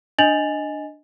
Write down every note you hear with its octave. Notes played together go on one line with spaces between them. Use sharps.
D4 D#5 G#5 A6 F7 F#7